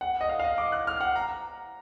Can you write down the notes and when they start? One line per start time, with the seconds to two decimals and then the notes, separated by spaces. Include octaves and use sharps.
0.01 F#5
0.21 D#5
0.29 F5
0.40 F5
0.44 D#5
0.58 D6
0.72 F#6
0.87 F6
1.01 F#5
1.16 A#5